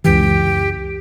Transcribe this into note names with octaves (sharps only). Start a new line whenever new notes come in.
C#2 F#2 E3 G4